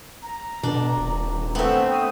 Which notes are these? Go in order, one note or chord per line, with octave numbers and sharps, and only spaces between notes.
A#5
B2 D4
D#1
A3 B3 C4 E5
D#6